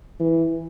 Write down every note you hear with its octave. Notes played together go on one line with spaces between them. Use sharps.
E3